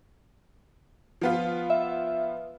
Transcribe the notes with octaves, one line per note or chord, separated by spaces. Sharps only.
F3 B3 F4
E5